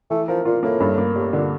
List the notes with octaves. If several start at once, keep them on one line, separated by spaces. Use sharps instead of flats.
E3 A3
F3 A#4
A#2 F4
A2 A#3
G2
A#3
A2 G3
A#2 D3